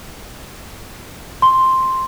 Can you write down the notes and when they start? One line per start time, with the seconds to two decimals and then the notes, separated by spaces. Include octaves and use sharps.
1.42 C6